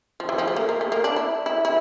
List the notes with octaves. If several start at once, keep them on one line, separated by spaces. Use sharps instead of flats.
F3
E3
F3
A3
A#3
A#3
A3
A#3
D4
E4
E4
E4